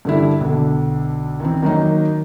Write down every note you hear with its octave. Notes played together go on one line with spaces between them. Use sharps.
G2 D3 E4
B1 D3
D#3 E3 C4
D#3 F#3 A#3 D#4